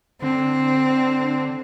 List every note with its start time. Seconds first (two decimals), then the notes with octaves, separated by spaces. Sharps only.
0.22 D3 C4